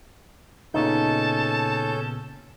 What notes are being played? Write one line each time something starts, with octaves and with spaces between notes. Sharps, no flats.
A#2 C#3 B3 C#4 D#4 A4 A5 G6